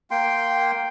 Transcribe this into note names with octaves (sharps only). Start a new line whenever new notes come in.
A#3 G5 C6